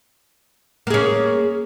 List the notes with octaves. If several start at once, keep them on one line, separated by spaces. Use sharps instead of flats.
A#3 C#4 G#4